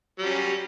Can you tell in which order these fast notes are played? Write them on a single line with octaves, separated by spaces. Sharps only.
G3 F#3 C#4